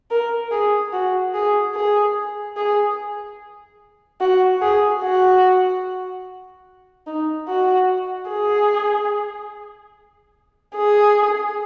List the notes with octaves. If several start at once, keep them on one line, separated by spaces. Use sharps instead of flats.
A#4
G#4
F#4
G#4
G#4
G#4
F#4
G#4
F#4
D#4
F#4
G#4
G#4